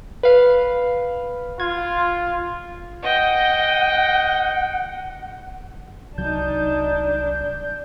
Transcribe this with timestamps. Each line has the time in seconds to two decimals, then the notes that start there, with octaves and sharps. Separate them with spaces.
0.23 B4 F5
1.60 F4 G#6
3.03 D#5 F#5 G5
6.18 C2 F#3 D4 D#4 A5 G6